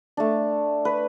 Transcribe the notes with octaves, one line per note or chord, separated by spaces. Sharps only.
A3 D4
B4